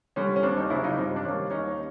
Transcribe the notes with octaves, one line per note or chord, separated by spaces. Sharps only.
D3 G3 C#4
C#4
D#2 C4 D4
C#4 D#4
C#3 F#3 D4 E4
D#4 F4
G2 C4
D4
D#3 G3 A#3 C#4
D#2 C#4 D#4